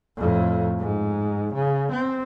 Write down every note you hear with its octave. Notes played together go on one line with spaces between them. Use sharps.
F2 A2
G#2
C#3
C4